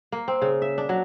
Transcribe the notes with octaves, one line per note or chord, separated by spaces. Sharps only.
A#3
C4
C#3
E5
D4
F#3